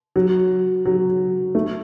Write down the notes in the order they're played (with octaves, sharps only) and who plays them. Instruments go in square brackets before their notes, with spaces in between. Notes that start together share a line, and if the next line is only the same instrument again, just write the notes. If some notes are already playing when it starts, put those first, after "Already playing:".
[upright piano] F#3
F#3
A3